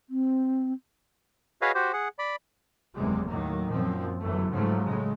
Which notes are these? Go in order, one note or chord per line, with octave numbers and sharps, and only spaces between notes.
C4
F#4 G#4 B4 C#5 D#5 F5
F#4 G4 C5
G#4 F#5
D5 B5
F#1 E2 C3 G3 G#3
D#2 A2 D#3 F#3 A#3
F#2 A#2 F3 C4
G1 F#2 E3 F#3 A3
G#2 C#3 F3 F#3 A3
A2 C#3 G#3